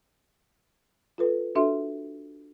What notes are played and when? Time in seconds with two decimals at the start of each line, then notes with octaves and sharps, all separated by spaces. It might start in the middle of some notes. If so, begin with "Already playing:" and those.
1.18 F4 A4 B4
1.55 D4 F#4 A4 E5 C6